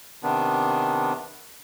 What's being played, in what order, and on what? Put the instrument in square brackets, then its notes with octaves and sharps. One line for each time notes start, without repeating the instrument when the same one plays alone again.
[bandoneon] C3 D#3 B3 D4